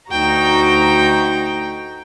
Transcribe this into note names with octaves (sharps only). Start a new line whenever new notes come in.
D2 D#4 F#4 G5 A#5